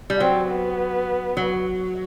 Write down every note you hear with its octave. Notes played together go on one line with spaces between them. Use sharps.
G3
F#3 C4
B3
F#3